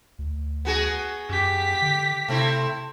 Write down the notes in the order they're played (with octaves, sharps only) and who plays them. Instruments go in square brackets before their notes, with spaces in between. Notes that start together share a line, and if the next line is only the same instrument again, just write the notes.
[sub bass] D2
[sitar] B3 F#4 G#4
[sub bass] F#2 [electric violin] G4 B6
[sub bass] D3
[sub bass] C3 [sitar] A3 C4 E4